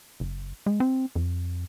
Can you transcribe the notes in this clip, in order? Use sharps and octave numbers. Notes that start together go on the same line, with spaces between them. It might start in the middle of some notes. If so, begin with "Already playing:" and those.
F#1
G#3
C4
F2